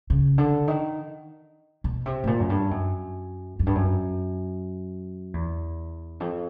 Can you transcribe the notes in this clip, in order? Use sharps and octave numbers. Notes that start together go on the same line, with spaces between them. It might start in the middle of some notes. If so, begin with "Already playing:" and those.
C#3
D3
D#3
B2
C3
A2
A#2
F#2
G2
F#2
F#2
G2
F#2
E2
F2